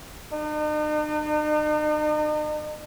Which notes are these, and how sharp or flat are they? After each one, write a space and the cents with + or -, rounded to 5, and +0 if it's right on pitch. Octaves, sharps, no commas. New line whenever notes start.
D#4 -45